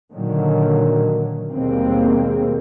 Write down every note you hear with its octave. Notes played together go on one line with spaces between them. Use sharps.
A#2 D3 D#3 F#3
D#2 B2 G3 G#3 A#3 C4